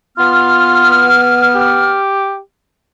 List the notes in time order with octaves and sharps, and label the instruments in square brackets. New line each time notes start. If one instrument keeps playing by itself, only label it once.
[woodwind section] B3 F6 [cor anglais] F4
[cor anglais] G4